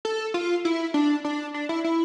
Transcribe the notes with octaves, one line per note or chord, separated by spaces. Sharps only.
A4
F4
E4
D4
D4
D4
E4
E4